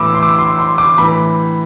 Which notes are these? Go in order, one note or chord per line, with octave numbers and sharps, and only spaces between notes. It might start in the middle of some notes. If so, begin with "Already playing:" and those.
Already playing: A2 E3 B5 D6 E6
C6
D6
C6
C6
D6
A2 E3 B5